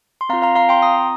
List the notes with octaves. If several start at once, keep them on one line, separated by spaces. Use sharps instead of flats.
C6
C4 F4 F5 A#5
F5 A#5
F5 A#5
G5 C6
A#5 D#6